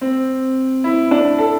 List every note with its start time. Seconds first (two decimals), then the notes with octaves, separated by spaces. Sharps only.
0.01 C4
0.84 E4
1.11 D4
1.38 A4